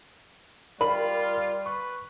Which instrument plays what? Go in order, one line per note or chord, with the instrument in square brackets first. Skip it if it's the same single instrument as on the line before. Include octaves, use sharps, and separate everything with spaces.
[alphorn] G3 [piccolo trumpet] F4 [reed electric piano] A#4 [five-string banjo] B5
[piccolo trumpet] B4 [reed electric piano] C#6